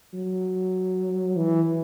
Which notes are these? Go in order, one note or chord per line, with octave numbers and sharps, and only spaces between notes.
F#3
E3